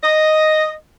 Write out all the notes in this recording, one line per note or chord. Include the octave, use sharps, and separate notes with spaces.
D#5